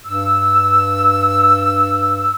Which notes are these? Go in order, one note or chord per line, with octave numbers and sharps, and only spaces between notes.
G2 E6